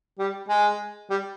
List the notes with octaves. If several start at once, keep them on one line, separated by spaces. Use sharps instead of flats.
G3
G#3
G3